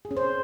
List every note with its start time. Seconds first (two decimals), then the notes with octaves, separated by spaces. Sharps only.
0.05 G#4
0.11 C#4
0.17 C5